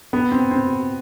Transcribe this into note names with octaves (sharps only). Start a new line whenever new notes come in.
B3
C4
C4